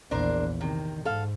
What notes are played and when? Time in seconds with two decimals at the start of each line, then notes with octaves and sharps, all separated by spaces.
0.11 A#1 E2 D4 A#4 C5
0.61 C3 D#3
1.05 G#2 A4 F5